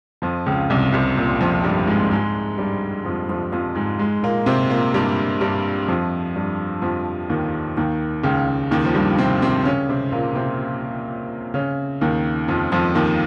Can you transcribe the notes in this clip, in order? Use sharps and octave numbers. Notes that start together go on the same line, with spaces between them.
F2 F3
C#2 C#3
C2 C3
C2 C3
A#2
F2 F3
G2 G3
G#2 G#3
G#2 G#3
G2 G3
F2 F3
F2 F3
F2 F3
G#2 G#3
G#2 G#3
A#2 A#3
C3 C4
A#2 A#3
G2 G3
G2 G3
F2 F3
G2 G3
F2 F3
D#2 D#3
D#2 D#3
C#2 C#3
D#2 D#3
F3
G2 G3
C3 C4
C3 C4
C#3 C#4
C3 C4
A#2 A#3
C3 C4
C#3 C#4
D#2 D#3
F2 F3
F2 F3
D#2 D#3